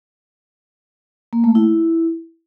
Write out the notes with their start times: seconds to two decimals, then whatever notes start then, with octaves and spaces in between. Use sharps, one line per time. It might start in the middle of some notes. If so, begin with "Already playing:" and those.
1.33 A#3
1.44 A3
1.55 E4